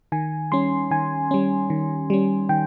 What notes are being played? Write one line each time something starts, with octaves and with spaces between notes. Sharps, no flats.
D#3 G#5
G3 C#4 C6
D#3 G#5
G3 C#4
D#3
G3 C#4
D#3 G5